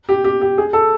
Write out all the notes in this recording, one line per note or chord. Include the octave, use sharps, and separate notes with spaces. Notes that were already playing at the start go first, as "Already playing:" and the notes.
G4
G4
G4
G#4
A4